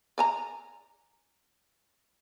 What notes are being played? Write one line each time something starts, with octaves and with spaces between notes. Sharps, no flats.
D5 G#5 A#5